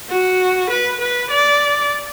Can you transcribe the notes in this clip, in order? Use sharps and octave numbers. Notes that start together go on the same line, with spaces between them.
F#4
B4
B4
D5